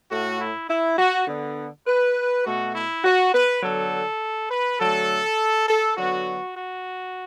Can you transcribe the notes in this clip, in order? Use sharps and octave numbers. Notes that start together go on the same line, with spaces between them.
A2 A3 F#4
E4
E4
F#4
D3 B3
B4
B2 A3 F#4
E4
F#4
B4
D3 F#3 B3 A4
B4
D3 F#3 A3 A4
A4
D3 F#3 B3 F#4
F#4